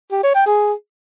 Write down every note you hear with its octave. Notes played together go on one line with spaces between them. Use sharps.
G4
C#5
G5
G#4